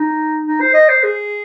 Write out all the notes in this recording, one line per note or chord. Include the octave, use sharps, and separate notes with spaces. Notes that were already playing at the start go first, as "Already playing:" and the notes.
Already playing: D#4
D#4
C5
D#5
C5
G#4